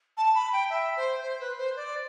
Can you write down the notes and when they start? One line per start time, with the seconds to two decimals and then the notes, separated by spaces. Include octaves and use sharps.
0.17 A5
0.34 B5
0.52 G5
0.69 E5
0.96 C5
1.22 C5
1.39 B4
1.57 C5
1.76 D5